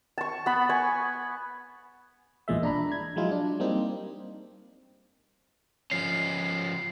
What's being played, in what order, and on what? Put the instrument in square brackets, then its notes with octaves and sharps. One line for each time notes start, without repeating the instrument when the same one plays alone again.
[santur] A5 C#6
B3 B5
G#5 C#6
[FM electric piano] A#1 E2 A#2 G#3 E5
D4 A#5 B5
G#6
F3 F#3 G#3 E4 F4
D4
G3 A#3 C4 D#4 G4
[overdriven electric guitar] F3 C#4 [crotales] C7